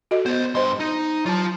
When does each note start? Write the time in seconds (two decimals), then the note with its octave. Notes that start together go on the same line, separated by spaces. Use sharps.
0.11 F#4 A4 D#5
0.26 B3 C5 D5
0.55 G2 C5 D#5 C6
0.80 D#4
1.26 F#3 F4 A5